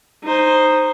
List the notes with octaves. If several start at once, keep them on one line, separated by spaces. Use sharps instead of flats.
D#4 C5